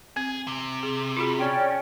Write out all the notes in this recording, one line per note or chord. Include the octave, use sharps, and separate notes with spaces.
C4 G#4
C3
G#4
F4 F#4 G#4 B5
C#4 D5 G5